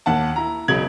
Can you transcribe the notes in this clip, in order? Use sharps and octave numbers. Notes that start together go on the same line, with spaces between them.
D#2 F#5 A5
E4 A#5
E1 B1 C#3 F#3 G#6 F#7